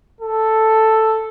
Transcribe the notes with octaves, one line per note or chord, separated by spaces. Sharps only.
A4